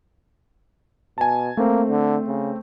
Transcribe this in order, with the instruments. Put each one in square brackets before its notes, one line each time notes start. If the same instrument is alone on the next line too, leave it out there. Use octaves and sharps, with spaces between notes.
[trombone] B2 [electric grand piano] G#5 A5
[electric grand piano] A3 C4 [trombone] A#3
[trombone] D3
C#3